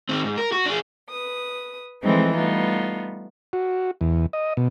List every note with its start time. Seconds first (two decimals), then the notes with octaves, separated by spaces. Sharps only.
0.09 D#3 C4
0.24 G#2
0.38 A#4
0.52 F#4
0.66 D4 G#4
1.09 B4 D#6
2.04 E3 F3 G#3 A3 C4 D#4
2.34 G3 A3 B3 D#4 F4
3.53 F#4
4.01 E2
4.33 D#5
4.57 B2